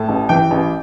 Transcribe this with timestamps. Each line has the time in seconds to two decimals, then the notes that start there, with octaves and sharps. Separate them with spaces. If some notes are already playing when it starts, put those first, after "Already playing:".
Already playing: A2 A5
0.09 A1
0.29 E3 G5
0.51 A1